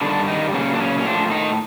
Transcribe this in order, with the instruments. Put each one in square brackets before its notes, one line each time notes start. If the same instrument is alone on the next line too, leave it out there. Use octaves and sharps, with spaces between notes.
[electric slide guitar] G2 D3 D#3 G3 D4
D#3 D#4
A#2 C#3 F#3 C#4
D4
C#3 C#4
C#4
A2 D3 F3 D4
D#3 D#4